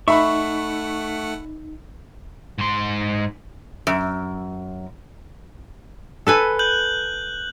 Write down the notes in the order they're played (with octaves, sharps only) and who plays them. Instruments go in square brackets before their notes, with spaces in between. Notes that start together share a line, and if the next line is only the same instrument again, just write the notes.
[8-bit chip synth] A3 F#5 [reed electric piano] D#4 [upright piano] E5 B5 [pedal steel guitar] C#6
[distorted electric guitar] G#2 C6
[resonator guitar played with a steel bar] F#2
[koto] A4 B4 G#5
[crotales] F#6 G6 F#7